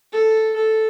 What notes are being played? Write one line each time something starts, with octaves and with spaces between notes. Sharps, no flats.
A4
A4